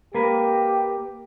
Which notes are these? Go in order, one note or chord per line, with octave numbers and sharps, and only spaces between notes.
A#3 G4 A#4 B4